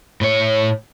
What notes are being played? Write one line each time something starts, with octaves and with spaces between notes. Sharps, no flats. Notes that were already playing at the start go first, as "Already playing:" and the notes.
A2 C#5